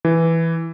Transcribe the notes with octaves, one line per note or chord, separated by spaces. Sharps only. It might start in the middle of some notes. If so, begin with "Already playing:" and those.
E3